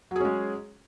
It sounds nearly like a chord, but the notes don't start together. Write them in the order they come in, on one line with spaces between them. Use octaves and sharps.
F#3 G#4 C#4 G#3